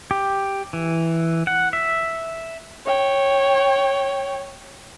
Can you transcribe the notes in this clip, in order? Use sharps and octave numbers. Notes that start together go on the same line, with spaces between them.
G4
E3
F#5
E5
C#5 G5